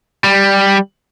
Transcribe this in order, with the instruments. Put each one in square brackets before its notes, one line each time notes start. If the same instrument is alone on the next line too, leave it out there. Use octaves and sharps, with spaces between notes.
[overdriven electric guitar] G3